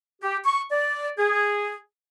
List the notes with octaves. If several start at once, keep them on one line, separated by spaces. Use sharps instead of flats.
G4
C#6
D5
G#4